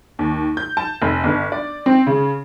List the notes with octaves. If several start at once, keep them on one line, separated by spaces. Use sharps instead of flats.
D#2
G6
A5
F1
G1
D5
C4
C#3